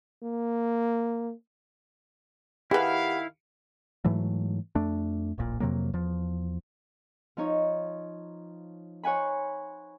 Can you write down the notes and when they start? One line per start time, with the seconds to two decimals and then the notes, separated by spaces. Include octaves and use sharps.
0.23 A#3
2.71 D#3 E4 G4 G#4 B4 F5 F#5 B5
4.05 G#2 E3 F#3 A3
4.75 F2 A3 D4
5.38 D1 A#1 A#2
5.60 F2 C3 F#3 A#3
5.93 E2 F3
7.37 F3 D#4 C#5
9.04 C5 C#5 F#5 G#5 B5